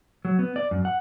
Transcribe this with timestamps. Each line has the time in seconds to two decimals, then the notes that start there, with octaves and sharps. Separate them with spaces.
0.25 F#3
0.39 B3
0.56 D5
0.71 F#2
0.85 F#5